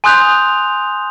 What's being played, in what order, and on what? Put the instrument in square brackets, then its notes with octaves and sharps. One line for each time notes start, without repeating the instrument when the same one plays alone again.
[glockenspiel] G#5 C6 D#6 F#6 G6 F7